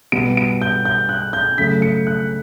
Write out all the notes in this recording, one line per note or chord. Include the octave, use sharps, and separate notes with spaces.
B2 G3 B3 D7
D7
G6
G6
F#6
G6
C#3 F#3 A3 B6
C#7
F#6